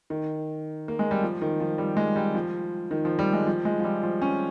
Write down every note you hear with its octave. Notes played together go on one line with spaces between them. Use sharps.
D#3
A#3
G#3
G3
F3
D#3
F3
G3
G#3
G3
F3
D#3
F3
G3
G#3
F3
G#3
F3
G3
F3
C#4